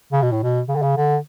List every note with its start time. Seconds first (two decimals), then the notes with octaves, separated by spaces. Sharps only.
0.12 C#3
0.22 B2
0.32 A2
0.43 B2
0.69 C#3
0.76 D3
0.83 C#3
0.97 D3